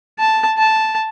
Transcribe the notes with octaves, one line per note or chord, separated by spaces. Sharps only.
A5
A5